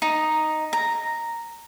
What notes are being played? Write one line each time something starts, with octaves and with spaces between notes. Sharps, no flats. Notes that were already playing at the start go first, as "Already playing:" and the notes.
D#4
A#5